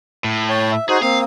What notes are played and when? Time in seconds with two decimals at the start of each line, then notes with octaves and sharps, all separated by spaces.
0.24 A2
0.49 C#5 G5 A5
0.72 E5
0.89 D#4 F#4 G#4 C5
1.02 A#3 C4 F5 D#6